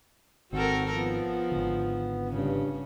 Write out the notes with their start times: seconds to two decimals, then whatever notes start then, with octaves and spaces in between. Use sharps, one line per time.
0.52 G#1 D#3 C4 F#4 A4 A#4
0.96 F3 B3
1.51 G#1 D3
2.29 G2 C#3